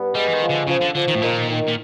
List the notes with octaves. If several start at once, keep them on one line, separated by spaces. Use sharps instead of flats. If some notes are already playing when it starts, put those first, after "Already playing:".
Already playing: G2 B3
G3 G#3
E3
D#3
F3
D3
C#3 F3
D3
D3 F3
D#3
A2
A#2 D#3
D#3
A#2